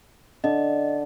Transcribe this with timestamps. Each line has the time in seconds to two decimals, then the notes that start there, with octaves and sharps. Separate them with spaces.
0.44 D3 D#5